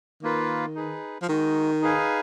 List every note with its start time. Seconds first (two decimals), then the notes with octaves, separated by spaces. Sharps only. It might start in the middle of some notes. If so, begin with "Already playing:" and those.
0.22 D#3 A#3 F4 B4
0.76 D#4 G#4 B4
1.22 F3
1.29 D#3 G#3 D#4 F#4
1.81 D#4 G#4 B4 F5 G#5